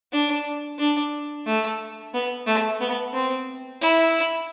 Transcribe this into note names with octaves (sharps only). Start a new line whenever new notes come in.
D4
D4
A3
B3
A3
B3
C4
E4